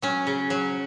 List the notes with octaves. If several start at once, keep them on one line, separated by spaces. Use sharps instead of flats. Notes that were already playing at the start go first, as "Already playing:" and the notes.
F#3 C#4
C#3
F#3